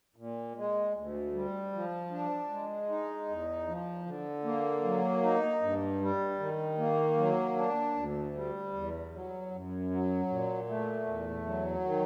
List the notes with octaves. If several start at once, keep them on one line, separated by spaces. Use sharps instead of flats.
A#2
G#3
D2
G3
F3
D4
G#3
D#4
E2
F3
D3
A#3
F#3
D#4
G2
G3
D#3
A#3
F#3
D4
D2
G3
E2
F#3
F#2
F#3
A#2
A3
E2
F#3
D#3